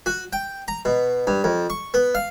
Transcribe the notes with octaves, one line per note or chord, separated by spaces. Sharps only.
F#4
G5
A#5
B2
G2
F2
C#6
B3
F5